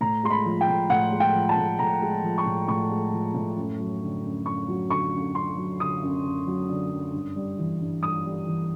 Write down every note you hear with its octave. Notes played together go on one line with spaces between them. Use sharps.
A2 A#5
G#3 C6
B5
F3
G5
A2
A2 F#5
G#3
G5
F3
A5
A2
A2 A#5
G#3
F3
C#6
A2
A2 C#6
G#3
F3
A2
F#2
F#3
D3
F#2
F#2 C#6
F#3
D3 C#6
F#2
F#2 C6
F#3
D3 D#6
F#2
F#2
F#3
D3
F#2
G2
G3
E3
G2
G2 D#6
G3
E3